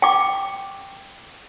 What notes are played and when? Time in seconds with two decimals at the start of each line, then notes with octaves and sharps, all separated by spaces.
0.02 G5 D6